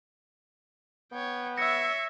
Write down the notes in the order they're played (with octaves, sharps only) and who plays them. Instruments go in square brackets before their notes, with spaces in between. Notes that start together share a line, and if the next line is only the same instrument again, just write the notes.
[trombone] B3 [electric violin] C#5 G5
[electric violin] C#5 E5 [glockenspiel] E6 A#6 [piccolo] C#7